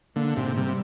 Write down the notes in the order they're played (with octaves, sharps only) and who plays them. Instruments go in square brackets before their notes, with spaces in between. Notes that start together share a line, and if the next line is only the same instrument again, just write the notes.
[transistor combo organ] D3 [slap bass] A#3
[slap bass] G#2 [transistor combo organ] C3
[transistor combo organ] C3 [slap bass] G3